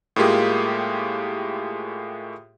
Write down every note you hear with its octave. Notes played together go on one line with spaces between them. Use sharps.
A2 G#3 A#3 F4 G4 G#4